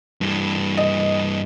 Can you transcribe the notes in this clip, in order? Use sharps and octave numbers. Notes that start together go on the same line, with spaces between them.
G2 E3
D#5